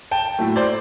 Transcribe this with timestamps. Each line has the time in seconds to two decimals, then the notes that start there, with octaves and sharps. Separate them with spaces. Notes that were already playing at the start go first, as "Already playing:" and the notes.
0.11 G5 A5
0.39 A2 F#3 A3
0.56 C5 D5